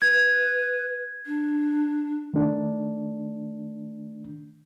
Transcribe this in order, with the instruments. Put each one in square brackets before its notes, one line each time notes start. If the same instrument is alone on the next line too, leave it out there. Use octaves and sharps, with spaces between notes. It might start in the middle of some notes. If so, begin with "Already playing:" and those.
[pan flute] B4 [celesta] G#6
[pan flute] D4
[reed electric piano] D#3 A3 D4